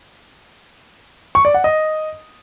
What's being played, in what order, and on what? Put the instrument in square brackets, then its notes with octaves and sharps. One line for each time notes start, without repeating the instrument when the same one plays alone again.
[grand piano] C#6
D5
F#5
D#5